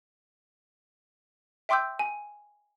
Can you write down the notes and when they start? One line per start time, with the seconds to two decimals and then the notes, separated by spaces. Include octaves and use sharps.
1.69 E5 G5 C6 D6 E6 G6
1.99 G#5